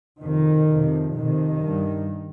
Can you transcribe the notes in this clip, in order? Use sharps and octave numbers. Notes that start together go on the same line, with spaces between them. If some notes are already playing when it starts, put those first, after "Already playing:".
F2 C3 D#3
F2 C3
F2 C3 D#3
G2